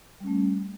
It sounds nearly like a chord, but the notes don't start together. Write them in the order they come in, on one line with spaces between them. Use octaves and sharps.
G3 C#4 A3